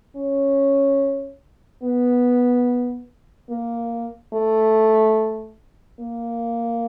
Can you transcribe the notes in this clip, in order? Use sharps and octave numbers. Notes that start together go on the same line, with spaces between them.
C#4
B3
A#3
A3
A#3